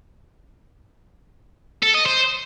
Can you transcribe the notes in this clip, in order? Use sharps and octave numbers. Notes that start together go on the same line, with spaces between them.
A4
D#5
C5